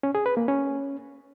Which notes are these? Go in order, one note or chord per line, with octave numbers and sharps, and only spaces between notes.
C#4
G#4
B4
A#3
C#4